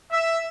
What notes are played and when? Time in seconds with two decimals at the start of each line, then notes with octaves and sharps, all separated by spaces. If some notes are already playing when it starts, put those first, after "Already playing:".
0.12 E5